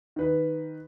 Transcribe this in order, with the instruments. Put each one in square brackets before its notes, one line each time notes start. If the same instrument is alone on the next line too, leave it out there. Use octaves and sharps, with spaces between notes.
[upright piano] D#3 B4